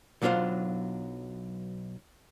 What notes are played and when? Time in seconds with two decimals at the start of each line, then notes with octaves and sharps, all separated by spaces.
0.22 B1 F#3 D4 F4 C5 F5